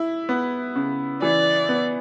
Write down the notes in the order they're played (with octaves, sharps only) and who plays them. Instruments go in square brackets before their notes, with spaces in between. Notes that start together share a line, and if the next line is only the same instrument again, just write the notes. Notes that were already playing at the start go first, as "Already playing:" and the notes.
Already playing: [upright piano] E4
B3
C#3
[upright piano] E3 [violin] D5
[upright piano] B3